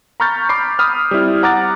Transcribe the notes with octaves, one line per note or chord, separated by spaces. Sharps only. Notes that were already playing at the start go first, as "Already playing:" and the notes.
A#5 B5 C#6 F6 G6 A6
B5 D6 C7
B5 D#6 F6
G3 C4 E4
F#5 A#5 D6 F6 F#6 A6